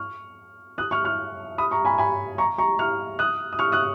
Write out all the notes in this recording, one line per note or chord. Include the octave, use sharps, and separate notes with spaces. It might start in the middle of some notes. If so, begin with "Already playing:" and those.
Already playing: C#6 F6
D#6 F#6
C#6 F6
C#6 F6
B5 D#6
A#5 C#6
G#5 B5
G#5 B5
A#5 C#6
A#5 C#6
C#6 F6
D#6 F#6
D#6
C#6 F6
D#6 F#6